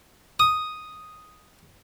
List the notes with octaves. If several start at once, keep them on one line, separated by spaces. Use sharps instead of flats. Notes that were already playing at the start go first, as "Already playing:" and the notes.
D#6